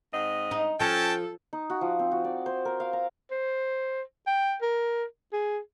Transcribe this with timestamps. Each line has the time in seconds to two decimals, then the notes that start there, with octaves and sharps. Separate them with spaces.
0.14 G#2 C4 D#5
0.51 D#4
0.80 F3 C#4 A4 G5 A5
1.53 D#4
1.70 F#4
1.81 F3
1.99 C4
2.12 F#4
2.24 D5
2.46 C5
2.65 A#4
2.80 F5
2.93 A#5
3.31 C5
4.27 G5
4.62 A#4
5.33 G#4